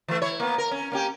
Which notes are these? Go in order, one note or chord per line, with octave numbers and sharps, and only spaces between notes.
E3 A3
E4 C#5
A#3 B3
A#4
C#4
A#3 C#4 G4